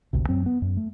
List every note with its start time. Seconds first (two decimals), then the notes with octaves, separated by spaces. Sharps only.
0.13 G#1 D2 C3
0.29 F#2 F#3 C4
0.46 B3
0.62 F#2
0.77 A3